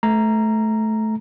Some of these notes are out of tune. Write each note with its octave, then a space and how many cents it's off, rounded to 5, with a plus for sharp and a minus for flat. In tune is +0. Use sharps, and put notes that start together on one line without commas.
A3 -15 A#5 +0